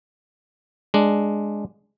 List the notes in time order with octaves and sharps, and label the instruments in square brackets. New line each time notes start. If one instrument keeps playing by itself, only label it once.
[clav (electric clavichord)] G#3 D4